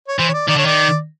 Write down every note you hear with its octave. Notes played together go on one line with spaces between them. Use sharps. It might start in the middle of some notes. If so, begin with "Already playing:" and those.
C#5
E3 C5
C#5
D5
D#3 D5
D3 C#5
D#3 D5